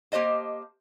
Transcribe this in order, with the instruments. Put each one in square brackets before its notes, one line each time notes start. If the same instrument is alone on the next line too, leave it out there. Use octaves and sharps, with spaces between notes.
[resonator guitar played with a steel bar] A#3 G4 C5 D#5 A5